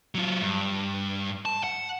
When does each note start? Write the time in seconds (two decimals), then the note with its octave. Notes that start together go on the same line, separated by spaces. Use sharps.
0.15 F#3 F4
0.42 G2
1.45 A5
1.64 F#5